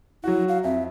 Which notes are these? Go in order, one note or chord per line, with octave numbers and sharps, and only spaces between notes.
F#3 E4 F#4
F5
F2 E5